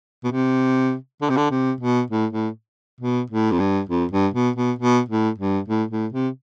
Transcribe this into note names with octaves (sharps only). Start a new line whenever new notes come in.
B2
C3
D3
C3
D3
C3
B2
A2
A2
B2
A2
F2
G2
F2
G2
B2
B2
B2
A2
G2
A2
A2
C3